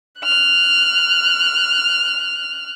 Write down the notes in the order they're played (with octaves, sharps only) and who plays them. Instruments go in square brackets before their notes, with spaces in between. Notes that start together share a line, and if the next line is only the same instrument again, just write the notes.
[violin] F6 F#6